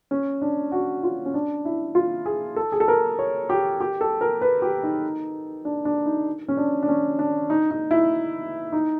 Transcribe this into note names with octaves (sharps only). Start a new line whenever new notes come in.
C#4
D4
F#4
F4
C#4
D4
E4
F4
G#4
A4
G#4
A4
A#4
C#5
G4
G4
A4
A#4
B4
G4
D#4
D4
D4
D#4
C#4
D4
D4
C#4
D4
D#4
D#4
E4
D#4